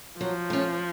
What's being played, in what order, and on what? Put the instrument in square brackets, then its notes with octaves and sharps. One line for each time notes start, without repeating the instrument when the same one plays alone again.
[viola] F3 [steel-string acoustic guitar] F#3
[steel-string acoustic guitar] A3 C#4